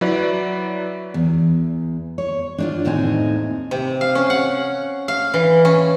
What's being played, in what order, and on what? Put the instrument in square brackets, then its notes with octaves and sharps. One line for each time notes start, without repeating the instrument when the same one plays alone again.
[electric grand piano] F#3 E4 B4 D5
[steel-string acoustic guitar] E2
C#5
D4 D#4 F4
D#2 A2 C4 D#4 G#5
[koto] C3
F5
C#4
F#5
F5
E3
C#4